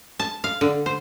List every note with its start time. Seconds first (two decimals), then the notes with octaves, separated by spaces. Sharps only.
0.19 A5
0.44 F5
0.61 D3
0.86 C5